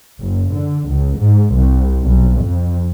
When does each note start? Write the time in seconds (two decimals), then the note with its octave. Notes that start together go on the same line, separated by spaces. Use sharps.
0.20 F#1
0.55 D3
0.88 C#2
1.20 G#2
1.55 C2
2.04 B1
2.43 F2